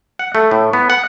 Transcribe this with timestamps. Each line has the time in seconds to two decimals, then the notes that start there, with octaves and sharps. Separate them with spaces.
0.19 F#5
0.35 A3
0.51 A2
0.73 B3
0.90 F#5